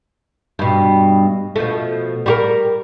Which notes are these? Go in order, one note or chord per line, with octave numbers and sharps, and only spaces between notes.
G2 B2
B2 F3 A3
G3 F#4 A#4